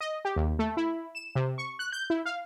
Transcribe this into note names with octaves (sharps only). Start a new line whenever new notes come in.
D#5
G4
D#2
A3
E4
E7
C3
C#6
F#6
G6
E4
F5